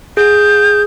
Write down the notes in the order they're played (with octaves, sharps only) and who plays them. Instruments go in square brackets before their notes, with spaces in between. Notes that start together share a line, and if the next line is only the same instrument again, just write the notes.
[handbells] G#4 [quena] G6